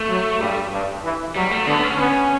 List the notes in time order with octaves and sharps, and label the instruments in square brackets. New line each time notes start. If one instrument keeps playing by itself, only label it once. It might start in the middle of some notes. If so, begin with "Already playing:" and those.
Already playing: [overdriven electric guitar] A3
[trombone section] F#3
[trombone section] G2 [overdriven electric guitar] G3
[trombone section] G2
E3
[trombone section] F#3 [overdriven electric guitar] G3
[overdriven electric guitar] A3
[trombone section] D3 [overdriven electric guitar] B3
[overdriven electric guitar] C#4
[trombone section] B3 [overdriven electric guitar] C#4